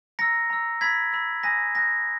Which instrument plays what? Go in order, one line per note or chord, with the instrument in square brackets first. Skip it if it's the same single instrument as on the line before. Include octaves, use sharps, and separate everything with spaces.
[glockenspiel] A#5 E6 A#6 C#7
A#5 E6
B5 E6 G#6 B6
B5 E6
G#5 D#6 F#6 A#6
G#5 D#6 F#6 A#6